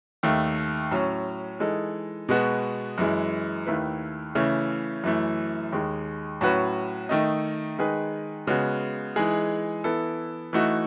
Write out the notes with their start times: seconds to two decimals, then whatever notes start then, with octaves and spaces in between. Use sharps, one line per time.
0.23 D#2 D#3 A3
0.91 A2 F#3 C#4
1.60 E3 G#3 D#4 A4
2.29 B2 G#3 B3 F#4
2.98 F#2 E3 G#3
3.66 D#2 D#3 A3 E4 B4
4.35 C#3 E3 A3 C#4
5.04 F#2 E3 A3
5.72 D#2 D#3 G#3
6.41 A2 F#3 C#4 F#4 B4
7.09 D#3 A3 D#4
7.79 D#3 G#3 D#4 G#4 B4
8.47 C#3 G#3 B3 F#4
9.16 E3 G#3 D#4 G#4
9.84 E3 B3 E4 A4
10.53 E3 A3 D#4 F#4